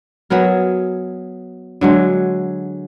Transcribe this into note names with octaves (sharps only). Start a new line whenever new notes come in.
F#3 B3 G#4 A#4
D3 F#3 G#3